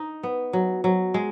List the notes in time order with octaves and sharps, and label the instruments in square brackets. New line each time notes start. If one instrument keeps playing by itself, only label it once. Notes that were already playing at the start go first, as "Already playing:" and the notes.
Already playing: [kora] D#4
B3
F#3
F#3
G#3